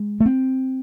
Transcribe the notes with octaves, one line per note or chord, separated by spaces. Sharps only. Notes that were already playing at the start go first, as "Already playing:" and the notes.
Already playing: G#3
A3
C4